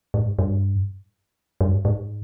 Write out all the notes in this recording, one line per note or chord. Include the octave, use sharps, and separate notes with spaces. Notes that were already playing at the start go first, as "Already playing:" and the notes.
G#2
G2
G2
G#2